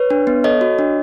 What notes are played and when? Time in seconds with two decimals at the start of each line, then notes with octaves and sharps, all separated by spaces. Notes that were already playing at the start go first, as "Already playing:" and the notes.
Already playing: B4 C#5
0.10 D4
0.27 B3
0.44 A4 C#5 D#5
0.61 F#4
0.79 D4